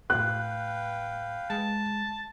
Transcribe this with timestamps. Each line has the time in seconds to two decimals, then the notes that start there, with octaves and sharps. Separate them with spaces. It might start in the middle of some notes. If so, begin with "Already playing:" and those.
0.10 A2 B4 F5 G5 F#6
1.50 G#3 A5